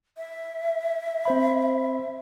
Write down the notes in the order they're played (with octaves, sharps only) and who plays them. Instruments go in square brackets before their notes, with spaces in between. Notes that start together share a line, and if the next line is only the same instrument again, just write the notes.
[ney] E5
[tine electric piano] C4 C5 B5